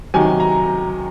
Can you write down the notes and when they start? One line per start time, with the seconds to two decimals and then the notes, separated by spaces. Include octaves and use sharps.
0.14 C3 D#3 F#3 G#5
0.40 A#5